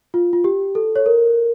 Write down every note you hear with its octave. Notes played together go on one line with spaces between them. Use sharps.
F4
F4
G4
A4
C#5
A#4